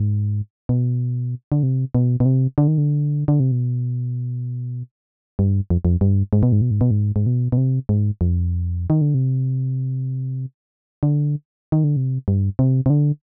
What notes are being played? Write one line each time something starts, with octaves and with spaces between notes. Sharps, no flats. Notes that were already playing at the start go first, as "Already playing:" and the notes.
Already playing: G#2
B2
D3
C3
B2
B2
C3
D3
D#3
D3
D3
C3
B2
G2
F2
F2
G2
G#2
B2
G#2
B2
G#2
B2
G#2
G#2
B2
B2
C3
G#2
F2
D#3
D3
C3
D3
D#3
D3
C3
G2
C3
C3
D3